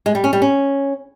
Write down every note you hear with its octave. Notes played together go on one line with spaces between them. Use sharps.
G#3
G3
C#4
G3
C#4